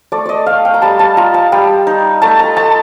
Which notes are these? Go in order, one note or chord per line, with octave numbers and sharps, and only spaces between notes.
A3 D5
D5 D#5
A3 F5
G5
A#5
G3 A5
A5
F4 A#5
A5
G3 G5
D#4
A3 A5
A#5
A3 A5